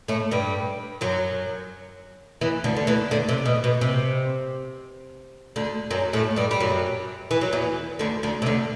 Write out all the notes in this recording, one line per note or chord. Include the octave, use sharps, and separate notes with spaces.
A2 A3
G2 G3
F#2 F#3
E2 E3
D2 D3
D3
E2 E3
D2 D3
C3
B2
B2
C3
D2 D3
F#2 F#3
A2 A3
G2 G3
G3
F#2 F#3
E3
F#3
E2 E3
D2 D3
D2 D3
C3
D2 D3